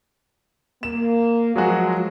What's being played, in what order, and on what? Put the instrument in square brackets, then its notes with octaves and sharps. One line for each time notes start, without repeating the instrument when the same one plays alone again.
[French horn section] A#3 [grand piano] E7
[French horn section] F3 [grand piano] F#3 G#3 F#4